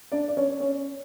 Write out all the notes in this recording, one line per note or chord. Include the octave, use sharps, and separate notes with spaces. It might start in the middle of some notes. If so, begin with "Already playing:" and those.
D4 D5
D5
C#4 C#5
C#4 C#5